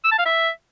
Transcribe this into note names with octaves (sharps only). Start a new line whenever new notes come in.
E6
A5
F5
E5